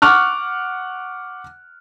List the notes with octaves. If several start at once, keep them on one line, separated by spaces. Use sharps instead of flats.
F#5 C#6 D6 F6 F#6